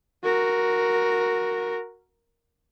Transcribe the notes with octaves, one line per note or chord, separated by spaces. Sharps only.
F#4 A#4